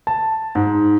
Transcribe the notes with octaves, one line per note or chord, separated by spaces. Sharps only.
A5
G#2